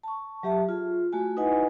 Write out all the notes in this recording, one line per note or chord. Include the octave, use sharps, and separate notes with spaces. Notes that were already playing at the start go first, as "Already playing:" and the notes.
A5 C#6
F#3 G4 E5 A5
F4 G#4
A3 F#4 G#5
D#4 E4 B4 D#5 F#5 G#5